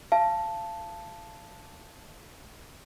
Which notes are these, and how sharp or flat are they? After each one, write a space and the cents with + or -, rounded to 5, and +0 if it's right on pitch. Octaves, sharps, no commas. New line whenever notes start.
F5 -30 A5 +0